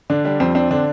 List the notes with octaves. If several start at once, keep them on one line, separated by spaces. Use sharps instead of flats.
D3 D4
G3 D4
F2 C4
C4 D4
D3 D4